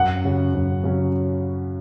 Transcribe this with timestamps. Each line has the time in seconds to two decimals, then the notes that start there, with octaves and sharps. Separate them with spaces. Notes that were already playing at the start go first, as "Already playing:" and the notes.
Already playing: F#2 F#5
0.24 C#3 F#3 C#4 F#4
0.54 F#2
0.84 C#3 F#3 C#4 F#4